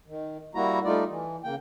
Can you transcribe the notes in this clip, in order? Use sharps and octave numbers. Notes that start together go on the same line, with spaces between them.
D#3
G3 A#3 E4 F#4 A#5
G3 A3 D#4 F4 D5
E3
C#3 A#3 G5